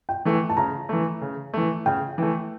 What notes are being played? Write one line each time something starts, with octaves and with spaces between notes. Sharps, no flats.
G5
E3 A3
A5
C#3 A#5
E3 A3
C#3
E3 A3
C#3 G5
E3 A3